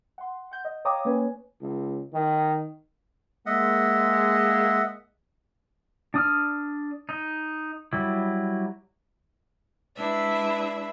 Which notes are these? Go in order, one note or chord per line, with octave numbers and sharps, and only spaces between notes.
F#5 C6
F#5 G6
D#5
C#5 F5 G5 A#5 D6 D#6
A#3 C#4 B4 C#5 G#5
C#2
D#3
G#3 A#3 D#5 E5 F#5
D4 D#6 F6
D#4
F#3 G3 E4
G#3 D4 E4 B4 E5